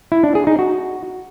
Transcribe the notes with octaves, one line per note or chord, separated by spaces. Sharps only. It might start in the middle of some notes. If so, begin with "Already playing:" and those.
E4
D4
G#4
D#4
F#4